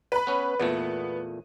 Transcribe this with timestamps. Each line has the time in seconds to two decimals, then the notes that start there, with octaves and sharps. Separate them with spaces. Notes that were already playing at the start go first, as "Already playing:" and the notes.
0.12 B4 B5
0.27 B3 C#4
0.60 E2 A#2 A3 B3